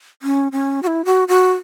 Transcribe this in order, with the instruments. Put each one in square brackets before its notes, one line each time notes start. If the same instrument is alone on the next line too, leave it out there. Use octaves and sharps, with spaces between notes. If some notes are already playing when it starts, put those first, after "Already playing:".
[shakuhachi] C#4
C#4
F#4
E4
F#4
F#4